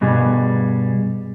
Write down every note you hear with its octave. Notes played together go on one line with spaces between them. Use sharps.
G2 B2 G3 G#4